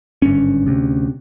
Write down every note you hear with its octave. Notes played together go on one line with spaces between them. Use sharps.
G#1 G2 D3 C#4
D2 C3